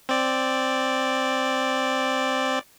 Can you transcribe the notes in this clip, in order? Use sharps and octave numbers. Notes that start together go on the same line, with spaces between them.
C4 D5